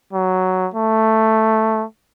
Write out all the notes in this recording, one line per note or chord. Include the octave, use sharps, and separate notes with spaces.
F#3
A3